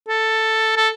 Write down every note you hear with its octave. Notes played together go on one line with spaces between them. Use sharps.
A4
A4